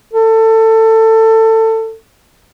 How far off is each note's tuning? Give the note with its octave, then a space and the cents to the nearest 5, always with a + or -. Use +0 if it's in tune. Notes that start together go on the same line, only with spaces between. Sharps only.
A4 +20